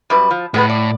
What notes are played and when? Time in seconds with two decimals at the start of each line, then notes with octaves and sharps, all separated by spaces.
0.10 F#2 G3 B4
0.31 F3
0.54 A2 G#3 B3 B4
0.69 D5